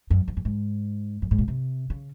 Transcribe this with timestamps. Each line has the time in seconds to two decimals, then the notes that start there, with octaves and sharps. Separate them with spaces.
0.10 F#2
0.28 F2
0.37 F#2
0.45 G#2
1.22 F#2
1.31 G#2
1.38 A#2
1.48 C3
1.90 C#3